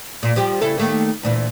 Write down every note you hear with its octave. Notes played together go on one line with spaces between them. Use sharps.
A#2
F3 G3 G4
C#3 E4 A4
D#3 A3 A#3
D2 A#2 E3